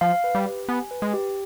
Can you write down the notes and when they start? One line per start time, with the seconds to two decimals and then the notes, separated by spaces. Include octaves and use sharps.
0.01 F3 F5
0.24 B4
0.35 G3
0.46 G4
0.69 B3 G#5
0.91 B4
1.02 G#3
1.14 G4